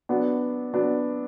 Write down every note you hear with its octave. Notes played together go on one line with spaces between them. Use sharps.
F#3 B3 D4
F#3 B3 D4